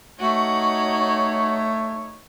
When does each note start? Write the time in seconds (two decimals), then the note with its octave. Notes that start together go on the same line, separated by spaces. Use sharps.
0.20 A3 D#4 F#4 C#5